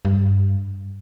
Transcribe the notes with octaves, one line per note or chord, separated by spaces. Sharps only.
G2